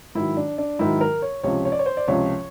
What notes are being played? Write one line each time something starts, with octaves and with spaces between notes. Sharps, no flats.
G#2 D#3 F#3 E4
D4
D4
G#2 D#3 F#3 E4
A#4
C#5
C#2 C3 F3 C#5
C#5
D5
C#5
C5
D5
C#2 C3 F3 C#5